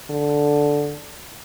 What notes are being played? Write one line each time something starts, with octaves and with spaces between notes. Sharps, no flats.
D3